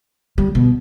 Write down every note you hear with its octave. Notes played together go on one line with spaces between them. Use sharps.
G3
B2